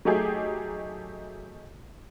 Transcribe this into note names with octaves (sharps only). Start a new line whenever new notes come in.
F#3 A3 D#4 G4 G#4